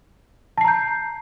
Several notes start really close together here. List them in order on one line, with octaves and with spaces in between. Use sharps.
A5 C7 A#5 G6